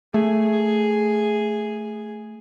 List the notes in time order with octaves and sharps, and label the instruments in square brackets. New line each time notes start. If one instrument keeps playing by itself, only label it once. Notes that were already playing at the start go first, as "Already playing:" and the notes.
[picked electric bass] A3 [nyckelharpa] G#4